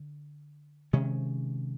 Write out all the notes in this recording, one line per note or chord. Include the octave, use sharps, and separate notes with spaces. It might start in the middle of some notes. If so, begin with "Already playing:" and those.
Already playing: D3
C3 D#3 G#3 C#4